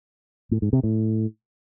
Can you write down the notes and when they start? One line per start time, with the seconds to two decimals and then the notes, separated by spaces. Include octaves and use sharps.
0.51 A2
0.62 G#2
0.73 C3
0.83 A2